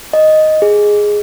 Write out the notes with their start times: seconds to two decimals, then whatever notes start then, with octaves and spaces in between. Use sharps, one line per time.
0.13 D#5
0.62 G#4